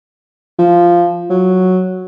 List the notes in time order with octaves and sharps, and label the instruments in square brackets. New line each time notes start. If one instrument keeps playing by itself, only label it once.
[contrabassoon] F3
F#3